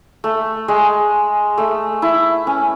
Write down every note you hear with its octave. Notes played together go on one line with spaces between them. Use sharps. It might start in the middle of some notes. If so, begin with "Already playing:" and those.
A3
G#3
A3
E4
C#4